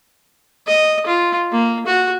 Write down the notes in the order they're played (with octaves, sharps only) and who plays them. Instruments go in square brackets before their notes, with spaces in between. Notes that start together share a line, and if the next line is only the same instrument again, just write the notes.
[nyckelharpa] D#5
F4
A#3
F#4